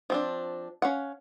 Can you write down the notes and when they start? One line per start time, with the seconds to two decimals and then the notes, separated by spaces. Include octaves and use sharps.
0.10 F3 C4 D4
0.82 C#4 F5 F#5